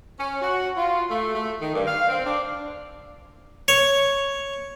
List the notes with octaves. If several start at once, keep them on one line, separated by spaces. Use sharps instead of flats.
C#4
F#4
F4
A3
A3
D#3
G2
F5
C4
D4
C#5